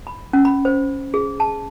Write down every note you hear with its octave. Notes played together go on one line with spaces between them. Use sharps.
B5
C#4
B5
C5
G#4
A5